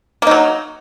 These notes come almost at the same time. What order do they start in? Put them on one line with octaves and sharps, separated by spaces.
A#3 D#4 F#3